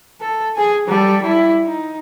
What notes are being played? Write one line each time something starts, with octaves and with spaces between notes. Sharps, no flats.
A4
G#4 G#5
G3 A4
G3 E4
D#4